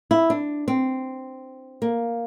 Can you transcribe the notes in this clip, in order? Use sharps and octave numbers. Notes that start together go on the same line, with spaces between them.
E4
D4
C4
A#3